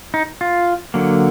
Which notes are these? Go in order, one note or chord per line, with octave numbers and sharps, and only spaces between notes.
D#4
F4
D3 F#3 A#3